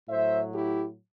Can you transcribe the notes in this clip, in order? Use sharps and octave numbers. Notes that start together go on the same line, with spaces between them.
A2 F#3 C5 E5
E4 G4